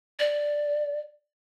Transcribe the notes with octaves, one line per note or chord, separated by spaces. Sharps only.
D5